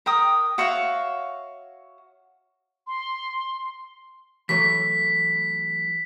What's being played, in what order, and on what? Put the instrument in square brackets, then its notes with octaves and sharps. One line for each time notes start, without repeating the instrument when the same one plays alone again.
[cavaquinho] A#4 G5 D#6
F#4 C#5 E5 F5
[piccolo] C6
[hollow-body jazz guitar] E3 F#3 A3 [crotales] B6